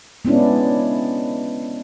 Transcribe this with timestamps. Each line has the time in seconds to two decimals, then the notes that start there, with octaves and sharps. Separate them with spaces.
0.25 G#3 B3 C#4 D4 E4